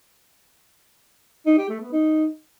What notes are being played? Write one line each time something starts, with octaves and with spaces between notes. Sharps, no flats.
D#4
G4
A3
B3
D#4